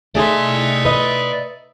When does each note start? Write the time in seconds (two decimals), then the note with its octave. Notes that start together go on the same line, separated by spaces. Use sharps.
0.15 A3 D#4 G#4 D5 E5 C6
0.85 B4 D#5